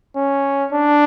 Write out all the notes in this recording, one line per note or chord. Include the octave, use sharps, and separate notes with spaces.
C#4
D4